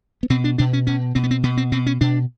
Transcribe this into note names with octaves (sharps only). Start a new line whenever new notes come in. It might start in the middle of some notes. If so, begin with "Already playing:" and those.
B3
B2 C4
D4
B2 D4
C#4
B2 C#4
B2 C4
B3
C4
B2 B3
C4
B2 C4
C#4
B2 D4